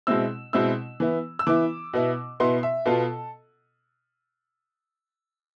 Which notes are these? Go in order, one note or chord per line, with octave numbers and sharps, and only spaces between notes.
B2 G#3 C4 E4 E6
B2 G#3 C4 E4 E6
E3 B3 E4
E6
E3 B3 E4 D6
B2 B3 E4
B2 B3 E4 C6
E5
B2 B3 F4 A4